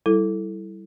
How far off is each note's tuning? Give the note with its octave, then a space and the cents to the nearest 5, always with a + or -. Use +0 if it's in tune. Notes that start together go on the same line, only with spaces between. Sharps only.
G3 -20 E4 +0 A4 +0